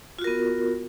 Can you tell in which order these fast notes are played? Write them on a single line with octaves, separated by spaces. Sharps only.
F4 F#4 A#4 B3